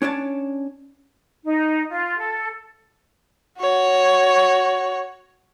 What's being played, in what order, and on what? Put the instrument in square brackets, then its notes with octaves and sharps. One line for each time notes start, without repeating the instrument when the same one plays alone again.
[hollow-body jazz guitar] C#4 D4 C#5 A5
[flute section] D#4
F4
A4
[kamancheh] F#4 C#5